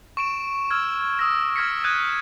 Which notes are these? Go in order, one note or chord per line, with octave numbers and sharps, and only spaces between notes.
C#6 D7 E7
E6 F6 G#6
D#6 E6 G#6 A#6 E7
C#6 F6 G#6 A#6 B6 C#7
D#6 E6 F#6 G#6 D7 D#7